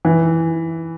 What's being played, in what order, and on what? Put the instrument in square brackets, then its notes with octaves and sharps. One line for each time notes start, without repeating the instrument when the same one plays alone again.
[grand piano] E3